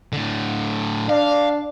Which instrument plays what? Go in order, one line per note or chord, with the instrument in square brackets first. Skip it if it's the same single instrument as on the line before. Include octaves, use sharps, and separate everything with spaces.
[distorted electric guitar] A2 D3
[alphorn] D4 [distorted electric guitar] F5